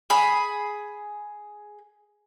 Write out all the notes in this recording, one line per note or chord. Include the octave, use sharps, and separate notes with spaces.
G#4 B5